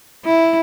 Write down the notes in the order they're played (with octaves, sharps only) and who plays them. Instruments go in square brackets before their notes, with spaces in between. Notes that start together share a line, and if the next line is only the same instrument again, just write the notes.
[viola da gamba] E4